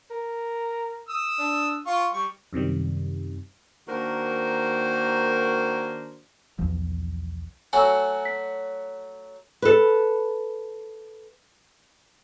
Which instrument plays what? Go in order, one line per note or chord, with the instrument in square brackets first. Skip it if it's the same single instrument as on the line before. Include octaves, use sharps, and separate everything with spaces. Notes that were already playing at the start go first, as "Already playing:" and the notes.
[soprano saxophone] A#4
[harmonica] D#6 E6
[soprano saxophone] D4
[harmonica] F4 C#6 [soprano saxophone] F5
[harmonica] G3 [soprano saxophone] C#6
[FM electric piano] F#2 C3 D#3 G3
[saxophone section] D#3 A#3 D4 F#4 A#4 C5
[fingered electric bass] B1 E2 F3
[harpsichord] F#3 A3 F#4 [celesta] G#5 E6
[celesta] B6
[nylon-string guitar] A4 B4